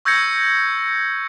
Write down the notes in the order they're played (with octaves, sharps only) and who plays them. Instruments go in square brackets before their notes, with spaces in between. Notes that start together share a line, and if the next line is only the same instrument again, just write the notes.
[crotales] C#6 E6 G6 G#6 A#6 C#7